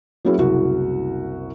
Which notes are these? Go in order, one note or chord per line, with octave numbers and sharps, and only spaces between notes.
F#3 A#3 C#4 E4 F#4 G#4
F#1 C2 F#4 G#4